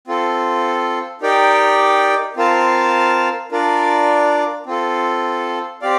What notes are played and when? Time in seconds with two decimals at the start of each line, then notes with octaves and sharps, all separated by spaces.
0.08 C4 F4 A4
1.22 D#4 G4 A#4 D5 G5
2.36 C4 F4 A#4 F5 A5
3.52 D4 F4 A#4 D5
4.66 C4 F4 A4
5.82 C4 G4 D5 F5